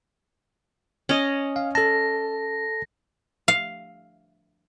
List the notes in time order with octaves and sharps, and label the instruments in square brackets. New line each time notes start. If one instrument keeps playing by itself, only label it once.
[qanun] C#4 D#5
[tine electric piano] F5
[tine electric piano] A4 A5 [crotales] A#6
[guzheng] F5